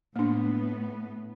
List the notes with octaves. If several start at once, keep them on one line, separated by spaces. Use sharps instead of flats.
A2 A#3 B3 D4